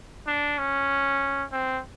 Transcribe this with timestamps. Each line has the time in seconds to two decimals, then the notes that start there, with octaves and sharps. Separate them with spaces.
0.27 D4
0.58 C#4
1.52 C4